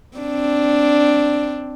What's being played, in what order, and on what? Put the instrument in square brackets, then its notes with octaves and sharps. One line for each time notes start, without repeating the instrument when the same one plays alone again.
[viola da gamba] C4 D4